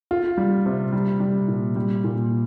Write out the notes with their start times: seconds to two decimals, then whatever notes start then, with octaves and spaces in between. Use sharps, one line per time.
0.11 F4
0.37 G3
0.66 C3
0.93 G3
1.20 G3
1.48 A#2
1.76 G3
2.04 A#2